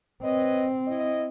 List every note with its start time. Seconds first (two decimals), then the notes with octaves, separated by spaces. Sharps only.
0.23 C4 B4 C#5 D#5
0.88 E4 D#5